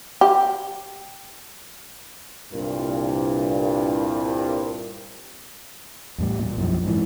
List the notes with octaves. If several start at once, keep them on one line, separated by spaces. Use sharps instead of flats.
G4
C2 G2 A#2
E2 A2 G3
A#2
B1 F#2 F3
G#2 E3